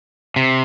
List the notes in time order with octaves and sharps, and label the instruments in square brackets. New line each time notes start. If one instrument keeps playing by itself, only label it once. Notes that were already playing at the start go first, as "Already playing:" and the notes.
[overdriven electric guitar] C3